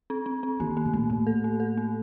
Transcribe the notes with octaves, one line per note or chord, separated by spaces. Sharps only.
C4
C4
C4
D#3 A#3
A#3
A2
A#2 A#3
A2 A#3
A4
A#3
A4
A#3